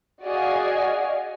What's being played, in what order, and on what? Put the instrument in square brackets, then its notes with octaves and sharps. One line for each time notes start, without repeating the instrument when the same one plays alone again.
[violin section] F#4 G#4 D5 D#5 F5 G#5